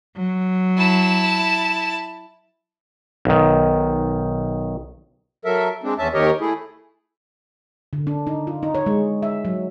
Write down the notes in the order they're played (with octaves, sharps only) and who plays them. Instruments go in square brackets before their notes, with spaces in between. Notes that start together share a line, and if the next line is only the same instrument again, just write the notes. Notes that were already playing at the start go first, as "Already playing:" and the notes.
[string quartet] F#3
[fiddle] E4 A5
[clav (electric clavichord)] B1 D#3
[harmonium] F#3 A4 A#4 E5
G#3 C4 D4
E2 C#4 E5 A5
D#2 D#3 G4 A#4 C#5 D#5
A3 E4 G#4
[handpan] D3
D4
D#4
F4
D#4
C#5
G#3
E5
F#3